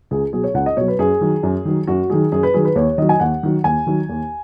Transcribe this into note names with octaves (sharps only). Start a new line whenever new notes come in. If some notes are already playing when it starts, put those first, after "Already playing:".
C#2 G#4
B2 F#3 G#4
C#5
C#2 F#5
D#5
B2 F#3 C#5
B4
F#2 G#4
D#3 F#3
F#2
D#3 F#3
F#2 F#4
D#3 F#3 G#4
F#2 G#4
B4
D#3 F#3 G#4
B4
D#2 C#5
D#3 F#3 D#5
G#5
D#2 F#5
D#3 F#3
D#2 G#5
D#3 F#3
D#2